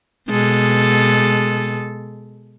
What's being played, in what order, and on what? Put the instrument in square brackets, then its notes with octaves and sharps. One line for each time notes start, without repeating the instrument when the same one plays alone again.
[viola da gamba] B2 G#3 A4